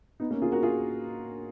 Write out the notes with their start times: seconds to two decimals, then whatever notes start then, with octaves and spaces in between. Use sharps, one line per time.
0.20 B3 D#4
0.31 A#3 C#4
0.42 F4 G#4
0.52 F#4 A#4
0.63 F4 G#4